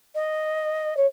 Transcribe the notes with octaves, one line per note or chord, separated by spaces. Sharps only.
D#5
C#5